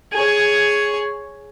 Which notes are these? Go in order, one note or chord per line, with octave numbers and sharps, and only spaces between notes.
G#4 C#5